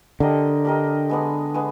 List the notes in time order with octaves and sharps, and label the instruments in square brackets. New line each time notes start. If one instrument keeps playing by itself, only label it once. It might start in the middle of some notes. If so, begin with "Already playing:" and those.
[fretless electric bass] D3 [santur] D4 G4 A#4 D#5
[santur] D4 G4 A#4 D#5
G#3 B3 D4
G#3 B3